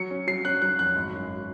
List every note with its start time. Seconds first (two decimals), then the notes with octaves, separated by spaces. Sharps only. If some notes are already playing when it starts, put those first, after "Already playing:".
Already playing: F#3 C#7
0.10 C#4
0.27 F#3 C7
0.45 C#4 F#6
0.62 F#3 F#6
0.79 F2 F#6
0.96 G#1
1.13 F#2